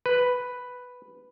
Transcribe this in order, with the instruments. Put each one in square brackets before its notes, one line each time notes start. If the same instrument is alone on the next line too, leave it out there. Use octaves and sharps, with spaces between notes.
[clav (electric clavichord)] B4